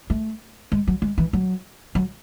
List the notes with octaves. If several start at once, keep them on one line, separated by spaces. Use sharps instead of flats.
A3
G#3
F#3
G#3
E3
F#3
F#3